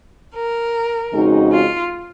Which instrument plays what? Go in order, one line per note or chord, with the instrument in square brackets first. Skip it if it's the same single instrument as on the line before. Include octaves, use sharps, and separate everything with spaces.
[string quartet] A#4
[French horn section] F2 C#3 G#3 D#4 F#4
[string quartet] F4